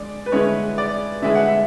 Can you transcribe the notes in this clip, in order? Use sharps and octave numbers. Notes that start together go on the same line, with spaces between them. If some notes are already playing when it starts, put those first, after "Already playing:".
Already playing: D3 G#3 D5
B4
D3 G#3 C#4 E4 C#5
D5
D3 G#3 C#4 E4 E5
F#5
E5